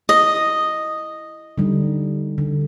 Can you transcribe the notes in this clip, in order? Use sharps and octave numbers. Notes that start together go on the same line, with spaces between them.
E4 D#5
D3 G3 D#4
D3